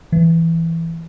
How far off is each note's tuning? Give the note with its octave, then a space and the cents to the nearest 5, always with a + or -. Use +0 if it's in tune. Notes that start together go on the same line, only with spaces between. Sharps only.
E3 +5